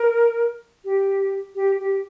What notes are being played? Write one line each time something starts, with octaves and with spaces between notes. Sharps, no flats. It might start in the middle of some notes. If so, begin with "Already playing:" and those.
Already playing: A#4
G4
G4
G4